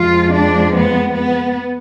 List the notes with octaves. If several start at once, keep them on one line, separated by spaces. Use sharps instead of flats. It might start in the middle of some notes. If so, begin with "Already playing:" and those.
Already playing: F2 F3 G#3 F4
D4
B3
B3